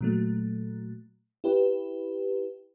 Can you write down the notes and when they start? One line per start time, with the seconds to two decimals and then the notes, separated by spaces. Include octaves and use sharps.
0.01 A#2 F#3 A3
1.44 E4 G4 B4